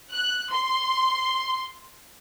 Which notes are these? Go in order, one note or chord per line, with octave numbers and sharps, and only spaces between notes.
F#6
C6